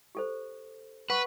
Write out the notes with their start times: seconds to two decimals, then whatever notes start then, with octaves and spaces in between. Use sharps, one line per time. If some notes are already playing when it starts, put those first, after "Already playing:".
0.15 G4 A4 C5
1.10 B4 F#5 C#6